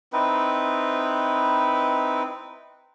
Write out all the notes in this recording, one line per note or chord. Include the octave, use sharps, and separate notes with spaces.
C4 D#4 E4 B4